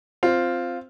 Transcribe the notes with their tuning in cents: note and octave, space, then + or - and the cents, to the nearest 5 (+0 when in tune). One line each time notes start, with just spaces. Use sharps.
C4 +0 F4 +0